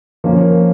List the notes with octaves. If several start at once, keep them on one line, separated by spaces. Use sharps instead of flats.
F3 A#3 C#4